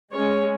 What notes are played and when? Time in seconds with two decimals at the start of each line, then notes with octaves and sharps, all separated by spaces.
0.12 G#3 C#4 C#5